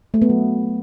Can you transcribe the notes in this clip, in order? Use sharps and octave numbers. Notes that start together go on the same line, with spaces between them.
A3
B3
F#3